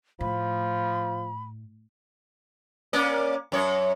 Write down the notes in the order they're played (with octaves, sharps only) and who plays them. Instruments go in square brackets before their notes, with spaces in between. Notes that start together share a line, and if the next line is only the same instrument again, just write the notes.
[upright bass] A2 [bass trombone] F3 [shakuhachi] B5
[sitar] A#3 C#4 D5
F#2 C#5